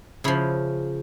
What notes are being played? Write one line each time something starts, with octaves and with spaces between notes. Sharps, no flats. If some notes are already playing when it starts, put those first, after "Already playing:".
C#3 F3 E4